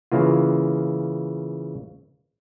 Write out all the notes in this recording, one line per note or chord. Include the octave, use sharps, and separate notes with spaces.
C#3 E3 A#3 F4